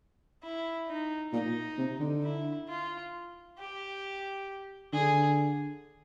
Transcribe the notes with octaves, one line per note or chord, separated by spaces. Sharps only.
E4
D#4
A#2 D#4
C3
D3
E4
F4
G4
D3 G#4